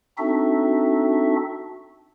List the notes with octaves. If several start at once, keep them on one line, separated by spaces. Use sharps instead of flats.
C4 D4 D#4 F#4 A4 E5